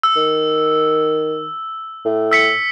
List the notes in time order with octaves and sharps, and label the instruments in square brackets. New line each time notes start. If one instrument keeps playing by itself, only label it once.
[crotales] E6
[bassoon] D#3
A2
[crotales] E6 B6 C#7